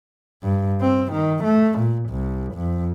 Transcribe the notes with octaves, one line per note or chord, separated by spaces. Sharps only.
G2
C4
D#3
A3
A#2
C2
F2